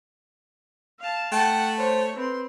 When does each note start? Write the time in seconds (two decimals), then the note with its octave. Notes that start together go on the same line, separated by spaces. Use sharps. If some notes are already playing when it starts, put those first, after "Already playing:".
0.99 F5 A5
1.32 A3 F#5 G5 A5
1.78 C5 C#5
2.16 C4 B4 C6